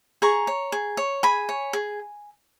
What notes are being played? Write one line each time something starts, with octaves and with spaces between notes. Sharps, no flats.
G#4 A#5 C#6
C#5
G#4
C#5
G#4 G#5 B5
C#5
G#4